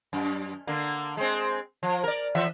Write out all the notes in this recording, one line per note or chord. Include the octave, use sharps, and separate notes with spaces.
F#2
D3 A#3
G#3 C4
F3
A#4 D5
E3 E5